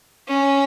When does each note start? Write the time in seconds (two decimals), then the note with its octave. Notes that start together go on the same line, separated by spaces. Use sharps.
0.28 C#4